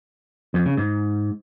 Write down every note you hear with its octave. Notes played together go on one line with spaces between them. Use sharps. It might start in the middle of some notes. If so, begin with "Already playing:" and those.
F2
C#3
G#2